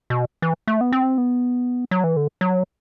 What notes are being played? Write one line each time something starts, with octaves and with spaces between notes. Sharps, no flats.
B2
E3
A3
B3
C4
B3
F#3
E3
D3
F#3